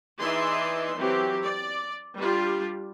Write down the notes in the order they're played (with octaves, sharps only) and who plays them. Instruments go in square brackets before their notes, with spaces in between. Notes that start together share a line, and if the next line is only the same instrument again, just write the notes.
[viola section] E3 D#4 G#4 D5 E5 C6
E3 F#3 C4 G4
D5
G3 D4 F4 G4